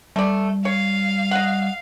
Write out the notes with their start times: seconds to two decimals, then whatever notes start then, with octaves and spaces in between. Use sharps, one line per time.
0.16 G3 A3 D5
0.65 C#5 F5
1.31 D#5 F#5